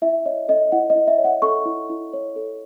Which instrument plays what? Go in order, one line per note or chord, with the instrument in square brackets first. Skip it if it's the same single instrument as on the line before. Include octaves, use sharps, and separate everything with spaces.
[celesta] E4 E5
C#5 D#5
A4 D#5
E4 F#5
D#5
E4
E5
C#5
F#5
A4 C#6
E4
E4
C#5
A4